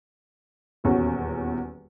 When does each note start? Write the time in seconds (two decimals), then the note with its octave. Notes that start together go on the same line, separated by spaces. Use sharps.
0.84 D#1 E2 C#4 F#4